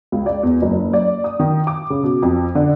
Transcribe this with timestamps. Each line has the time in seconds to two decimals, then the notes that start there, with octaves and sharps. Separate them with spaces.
0.12 C#2
0.26 D5
0.43 E2
0.62 F#1
0.93 D5
1.24 D#6
1.40 D#3
1.67 D6
1.90 C#3
2.03 B2
2.23 F2
2.55 D3